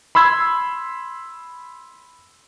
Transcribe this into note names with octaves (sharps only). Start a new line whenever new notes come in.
B5 C6 E6 G#6